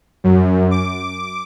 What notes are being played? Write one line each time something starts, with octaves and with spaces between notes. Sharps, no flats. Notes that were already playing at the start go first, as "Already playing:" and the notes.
F#2
D6